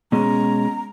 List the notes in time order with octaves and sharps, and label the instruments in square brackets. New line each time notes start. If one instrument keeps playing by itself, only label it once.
[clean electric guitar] B2 G#3 C#4 [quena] A#5